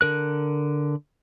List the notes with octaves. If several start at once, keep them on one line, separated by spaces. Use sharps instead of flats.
D3 A#4 F#6